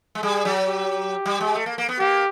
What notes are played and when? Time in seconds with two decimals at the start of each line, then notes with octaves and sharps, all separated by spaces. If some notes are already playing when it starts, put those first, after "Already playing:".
0.15 G#3
0.23 G3 G#4
0.45 F#3
0.67 G4
1.26 G3
1.41 G#3
1.55 A3
1.66 A#3
1.78 A#3
1.89 B3
1.99 A#3 G4